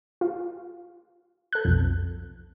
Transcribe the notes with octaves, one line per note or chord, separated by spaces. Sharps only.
F4
A4 F#6
B1 F2